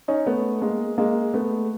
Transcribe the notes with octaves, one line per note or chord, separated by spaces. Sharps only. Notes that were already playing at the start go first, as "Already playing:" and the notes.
C#4 D#4
A3 B3
G#3 A#3
G#3 A#3
A3 B3